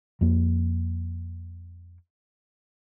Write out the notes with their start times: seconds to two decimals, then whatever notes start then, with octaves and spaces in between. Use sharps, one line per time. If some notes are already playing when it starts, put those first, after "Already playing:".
0.21 F2 A#3